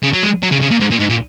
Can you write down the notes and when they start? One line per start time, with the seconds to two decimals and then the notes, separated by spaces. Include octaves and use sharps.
0.03 C#3
0.14 F#3
0.23 G#3
0.43 F#3
0.51 C#3
0.62 C#3
0.71 A#2
0.80 G#2
0.91 A#2
0.99 G#2
1.10 A#2